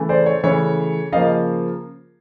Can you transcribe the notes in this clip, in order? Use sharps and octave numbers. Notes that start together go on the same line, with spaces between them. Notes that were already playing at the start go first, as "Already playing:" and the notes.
Already playing: C#3 E3 A3
C5 D5
C#5
C#3 E3 A3 C#5
C#3 F3 A#3 D#5 F5